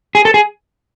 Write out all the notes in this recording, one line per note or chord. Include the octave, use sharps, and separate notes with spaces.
G#4
A4
G#4